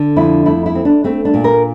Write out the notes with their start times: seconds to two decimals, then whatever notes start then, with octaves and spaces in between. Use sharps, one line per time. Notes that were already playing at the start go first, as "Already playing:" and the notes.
Already playing: D3
0.16 F2 E4
0.45 A3 E4
0.66 E4
0.75 C4
0.85 D4
1.04 A3 C4
1.25 D4
1.34 A#2
1.44 A#4